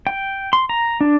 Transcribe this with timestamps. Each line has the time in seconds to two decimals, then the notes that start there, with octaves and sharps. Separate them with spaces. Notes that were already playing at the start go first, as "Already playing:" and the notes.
0.07 G5
0.53 C6
0.69 A#5
1.01 D4